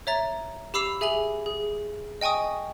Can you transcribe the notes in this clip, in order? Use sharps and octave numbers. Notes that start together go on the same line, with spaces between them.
C#5 E5 A#5 A6
G4 B5 D6 E6 C7 F7
G#4 E5 G#5 F7 F#7
G#4
D#5 G5 G#5 C#6 D#6